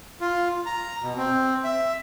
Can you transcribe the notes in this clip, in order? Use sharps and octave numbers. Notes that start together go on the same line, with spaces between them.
F4
A#5
B2
C4
E5